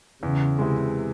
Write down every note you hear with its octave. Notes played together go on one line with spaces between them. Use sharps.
E2 C#3
C3 E3 G#3